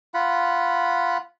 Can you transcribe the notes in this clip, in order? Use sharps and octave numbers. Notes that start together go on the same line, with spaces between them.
F4 F#5 B5